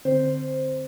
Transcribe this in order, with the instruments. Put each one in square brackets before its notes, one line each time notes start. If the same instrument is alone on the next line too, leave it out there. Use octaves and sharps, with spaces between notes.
[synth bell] D3 C4 C5